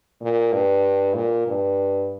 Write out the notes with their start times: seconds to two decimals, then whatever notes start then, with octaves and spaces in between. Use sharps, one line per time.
0.22 A#2
0.53 G2
1.15 A#2
1.47 G2